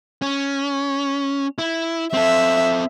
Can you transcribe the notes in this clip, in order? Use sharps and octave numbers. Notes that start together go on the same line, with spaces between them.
C#4
E4
C4 A4 E5